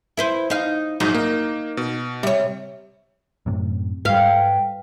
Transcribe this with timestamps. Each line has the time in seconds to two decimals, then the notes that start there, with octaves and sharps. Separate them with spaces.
0.17 E4 B4 C5
0.50 D#4 F5
1.00 A#1 G#2 F#3 D#4
1.14 A#3
1.77 B2
2.23 C3 G3 C#5
3.46 F#2 A2 C3
4.05 G#2 G3 B4 F5 G5